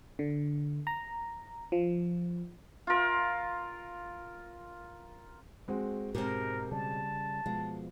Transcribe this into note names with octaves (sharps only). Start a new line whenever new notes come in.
D3
A#5
F3
F4 A#4
G#3 C4 F#4
G#2 B2 G#3 C4 G4 A#4
C#3 G3 A5
B2 F3 G#3